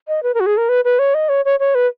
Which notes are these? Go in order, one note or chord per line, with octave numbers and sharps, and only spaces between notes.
D#5
B4
A#4
F#4
G#4
A#4
B4
B4
C#5
D#5
C#5
C#5
C#5
B4